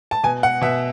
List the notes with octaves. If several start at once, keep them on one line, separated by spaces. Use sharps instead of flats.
A5
B2 G#5
F#5
B2 E5